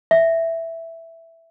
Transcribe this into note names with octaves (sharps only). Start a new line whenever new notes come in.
E5